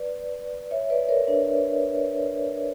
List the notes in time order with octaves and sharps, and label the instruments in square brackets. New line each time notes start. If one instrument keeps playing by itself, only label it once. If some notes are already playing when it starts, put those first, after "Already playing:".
Already playing: [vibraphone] B4 D5
C#5 E5
B4 D5
A#4 C#5
D4